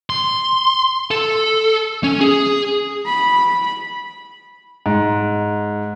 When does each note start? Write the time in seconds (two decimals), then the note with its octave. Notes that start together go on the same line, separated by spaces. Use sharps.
0.10 C6
1.11 A4
2.04 C#4
2.21 G#4
3.05 B5
4.86 G#2